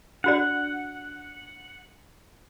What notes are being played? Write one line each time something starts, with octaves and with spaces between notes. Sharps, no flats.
D4 F#4 D5 F#5